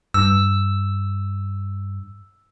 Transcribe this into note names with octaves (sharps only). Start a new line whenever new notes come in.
G2 E6